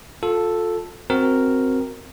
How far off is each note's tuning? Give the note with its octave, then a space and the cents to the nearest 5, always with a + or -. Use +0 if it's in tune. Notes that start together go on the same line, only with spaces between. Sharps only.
F4 +30 A4 +0
C4 +5 F#4 +0 A#4 +0